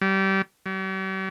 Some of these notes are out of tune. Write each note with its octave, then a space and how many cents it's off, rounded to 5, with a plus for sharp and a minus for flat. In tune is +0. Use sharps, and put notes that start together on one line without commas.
G3 -25
G3 -45